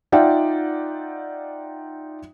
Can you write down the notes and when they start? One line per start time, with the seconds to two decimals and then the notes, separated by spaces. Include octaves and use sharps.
0.12 D#4 F4 D5 E5 F#5 G5